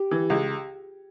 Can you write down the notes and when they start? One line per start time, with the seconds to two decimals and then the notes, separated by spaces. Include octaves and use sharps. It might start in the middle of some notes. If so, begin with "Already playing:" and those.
Already playing: G4
0.11 E3
0.30 C#2